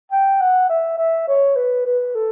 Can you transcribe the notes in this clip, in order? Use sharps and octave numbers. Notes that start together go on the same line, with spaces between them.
G5
F#5
E5
E5
C#5
B4
B4
A4